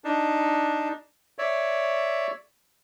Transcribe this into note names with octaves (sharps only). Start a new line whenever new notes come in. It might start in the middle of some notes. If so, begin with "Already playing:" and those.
D4 D#4
C#5 D5 E5